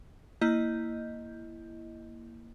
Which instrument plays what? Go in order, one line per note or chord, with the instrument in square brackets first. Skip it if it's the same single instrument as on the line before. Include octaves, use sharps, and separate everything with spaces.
[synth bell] A#3 E4 D#5 G6